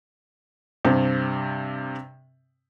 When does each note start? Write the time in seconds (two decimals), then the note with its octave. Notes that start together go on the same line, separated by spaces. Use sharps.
0.85 G2 C3 C4